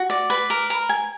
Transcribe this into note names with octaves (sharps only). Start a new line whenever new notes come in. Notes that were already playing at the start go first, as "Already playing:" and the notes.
Already playing: F#4
D5
B4
A#4
A#4
G#5